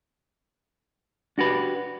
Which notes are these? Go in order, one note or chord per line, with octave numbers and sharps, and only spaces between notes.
D4 F#4 G4 B4